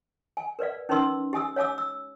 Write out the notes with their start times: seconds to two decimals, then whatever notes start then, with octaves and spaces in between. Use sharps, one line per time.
0.37 G#5
0.59 A#4 B4 D5 F5
0.89 C#4 D#4 A#4 B4 C6 E6
1.33 G4 G#5 D#6 E6
1.56 C#5 F5 G#5 D6 E6
1.78 E6